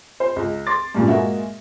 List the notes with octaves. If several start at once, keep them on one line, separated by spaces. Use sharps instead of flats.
C5
C#2
C6 D6 A6
G2 A#2 C#3
G#3 A#3 F#4 E5